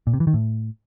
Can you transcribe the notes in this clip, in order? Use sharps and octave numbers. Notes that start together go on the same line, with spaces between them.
A#2
C3
E3
D#3
A2